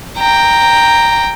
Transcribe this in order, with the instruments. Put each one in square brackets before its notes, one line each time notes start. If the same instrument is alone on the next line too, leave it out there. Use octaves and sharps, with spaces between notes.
[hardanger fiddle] G5 A#5